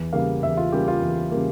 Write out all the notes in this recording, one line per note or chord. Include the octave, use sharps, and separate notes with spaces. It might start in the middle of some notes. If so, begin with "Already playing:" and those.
Already playing: E2
C#3 G3 A#3 F5
E2 E5
F4
C#3 G3 A#3 G4
F4
E2
C#3 G3 A#3